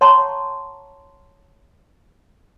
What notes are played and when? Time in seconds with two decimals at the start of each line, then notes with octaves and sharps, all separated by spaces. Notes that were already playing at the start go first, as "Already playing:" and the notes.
0.01 C#5 F#5 A5 A#5 C6 C#6